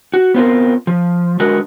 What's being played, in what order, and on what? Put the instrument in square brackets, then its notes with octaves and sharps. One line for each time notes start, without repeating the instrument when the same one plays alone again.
[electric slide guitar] F#4
B3 C4 F4 A#4
F3
D3 G#3 F#4 A#4 B4